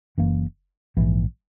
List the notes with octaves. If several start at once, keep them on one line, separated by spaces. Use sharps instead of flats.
F#1 F#2 E3 A#3
A#1 G#2 E3